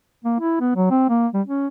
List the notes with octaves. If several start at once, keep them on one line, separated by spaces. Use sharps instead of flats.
A#3
E4
B3
F#3
C4
A#3
G3
C#4